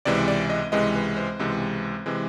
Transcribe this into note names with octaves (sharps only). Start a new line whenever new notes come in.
C#2 C3 E3 G#3 D5
D5
D#5
C#2 C3 E3 G#3 D#5
B4
C5
C#2 C3 E3 G#3
C3 E3 G#3